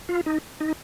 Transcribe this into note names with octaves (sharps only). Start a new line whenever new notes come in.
F4
D#4
D#4